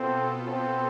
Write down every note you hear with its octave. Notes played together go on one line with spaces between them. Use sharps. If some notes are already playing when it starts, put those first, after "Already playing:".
Already playing: B2 B3 C4 F4 A4
C4